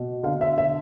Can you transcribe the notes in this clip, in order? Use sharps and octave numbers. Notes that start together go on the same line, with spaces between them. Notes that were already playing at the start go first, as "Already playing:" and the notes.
Already playing: B2
D3 F5
E5
E5